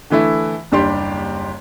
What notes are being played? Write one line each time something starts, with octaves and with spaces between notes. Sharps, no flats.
D3 E3 A3 E4
F#1 D#2 G3 D4 G4 C6